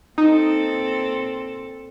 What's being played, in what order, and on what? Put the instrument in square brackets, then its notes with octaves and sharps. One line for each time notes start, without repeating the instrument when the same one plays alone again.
[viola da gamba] A#2 C4 A4 [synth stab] D#4